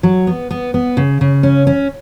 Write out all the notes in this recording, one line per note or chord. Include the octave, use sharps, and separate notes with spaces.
F#3
B3
B3
B3
C#3
C#3
C#4
C#4